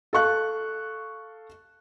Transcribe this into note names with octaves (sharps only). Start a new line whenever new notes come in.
A4 F5 C#6 F#6